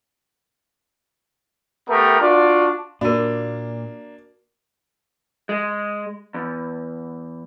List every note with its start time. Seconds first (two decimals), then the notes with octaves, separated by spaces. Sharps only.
1.88 A3 B3 G4 A#4
2.20 D4 F4 F#4 D5
3.01 A#2 A#3 D4 F#4 A#4
5.49 G#3
6.34 E2